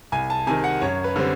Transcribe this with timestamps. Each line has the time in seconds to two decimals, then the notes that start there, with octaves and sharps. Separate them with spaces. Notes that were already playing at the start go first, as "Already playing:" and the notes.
0.12 C2 G#5
0.30 A5
0.47 C3 D#3 G#5
0.64 F#5
0.81 F#2 C#5
1.04 B4
1.16 D3 G3 C4